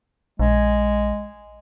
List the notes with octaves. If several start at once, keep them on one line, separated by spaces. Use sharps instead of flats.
A#1 G#3